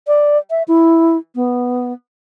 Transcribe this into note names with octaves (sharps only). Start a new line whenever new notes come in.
D5
E5
E4
B3